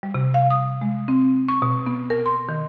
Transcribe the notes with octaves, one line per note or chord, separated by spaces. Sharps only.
G3
C3
F5
D#6
G#3
C4
C#6
B2
B3
A#4
C6
D#3